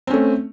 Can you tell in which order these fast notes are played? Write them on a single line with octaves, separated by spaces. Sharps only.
C4 C#4 A3